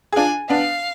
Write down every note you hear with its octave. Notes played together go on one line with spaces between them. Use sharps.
G#4
D4 F4 G#5
B3 D4 F5